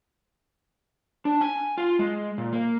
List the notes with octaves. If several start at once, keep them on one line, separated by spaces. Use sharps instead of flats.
D4
G#5
F4
G#3
A#2
A#3